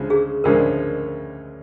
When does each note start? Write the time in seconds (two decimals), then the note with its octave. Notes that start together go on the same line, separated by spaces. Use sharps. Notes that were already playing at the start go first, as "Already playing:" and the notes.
Already playing: D2 C#3 F3 G#3
0.10 G#4
0.44 D2 C#3 F3 G#3 A#4